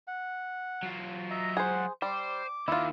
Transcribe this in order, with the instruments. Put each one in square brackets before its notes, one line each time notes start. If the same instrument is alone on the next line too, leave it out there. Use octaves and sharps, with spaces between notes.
[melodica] F#5
[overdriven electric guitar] F#3 F4
[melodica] D#5 E5 A#5
[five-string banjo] G#4 C5 [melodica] F#5
[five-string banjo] G3 [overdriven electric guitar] C5 [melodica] D6
[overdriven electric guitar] D#2 D#3 [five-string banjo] E4 F4